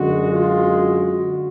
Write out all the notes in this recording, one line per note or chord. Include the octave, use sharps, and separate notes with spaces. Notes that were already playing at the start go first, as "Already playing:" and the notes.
Already playing: F#2 D3 G#3 F#4
F4
F#4